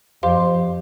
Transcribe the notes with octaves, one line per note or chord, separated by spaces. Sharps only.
F2 G4 C5 F5 C6